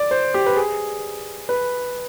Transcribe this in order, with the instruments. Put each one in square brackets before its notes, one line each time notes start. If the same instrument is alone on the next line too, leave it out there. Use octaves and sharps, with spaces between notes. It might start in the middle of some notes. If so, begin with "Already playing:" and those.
Already playing: [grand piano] D5
C5
G4
B4
G#4
B4